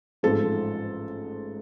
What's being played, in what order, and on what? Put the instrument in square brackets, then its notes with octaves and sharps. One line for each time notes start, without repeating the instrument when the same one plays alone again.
[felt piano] A1 G#2 F3 A4